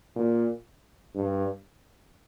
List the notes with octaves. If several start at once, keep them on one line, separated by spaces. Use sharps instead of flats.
A#2
G2